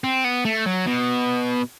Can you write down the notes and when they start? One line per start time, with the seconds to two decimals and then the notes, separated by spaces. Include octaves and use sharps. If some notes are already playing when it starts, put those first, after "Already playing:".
0.04 C4
0.24 B3
0.45 A3
0.66 F#3
0.87 B2